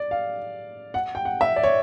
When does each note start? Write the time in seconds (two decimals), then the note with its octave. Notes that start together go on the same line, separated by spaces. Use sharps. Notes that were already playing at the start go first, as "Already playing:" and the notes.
Already playing: D5
0.11 F5
0.94 F#5
1.15 G5
1.25 F#5
1.41 E5
1.56 D5
1.63 C#5